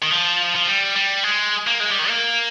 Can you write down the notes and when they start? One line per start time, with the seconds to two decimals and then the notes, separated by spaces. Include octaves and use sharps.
0.03 D#3
0.11 F3
0.56 F3
0.67 G3
0.96 G3
1.24 G#3
1.67 A#3
1.80 G#3
1.90 G3
1.99 D#3
2.09 A#3